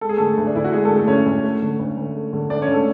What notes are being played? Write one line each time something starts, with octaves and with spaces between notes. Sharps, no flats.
G#3 A4
G#4
D3 A3 A4
D2
D4
D2 E4
F#4
G#3 G#4
A3 A4
D3
A3 A4
D2 C#4 C#5
D2
A3
D3
D2
D2
A3
D3
D2 D4 D5
C#4 C#5
D2
A3 A4